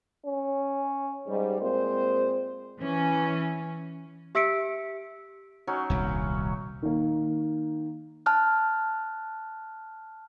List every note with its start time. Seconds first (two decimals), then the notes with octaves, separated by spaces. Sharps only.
0.25 C#4
1.28 G#2 G3
1.61 A#2 G#3 C4 C5
2.79 E3 C#4
4.35 G4 E5 E6 B6 C#7 D7
5.67 F#3 C#4 D#4
5.90 D#1 C2
6.82 D#3 A#3
8.26 A5 F6 F#6